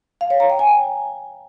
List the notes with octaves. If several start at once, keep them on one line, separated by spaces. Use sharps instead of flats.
F5
C#5
A#5
G5
G#5